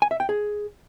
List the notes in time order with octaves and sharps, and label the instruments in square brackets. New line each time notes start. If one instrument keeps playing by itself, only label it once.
[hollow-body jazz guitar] G#5
E5
G5
G#4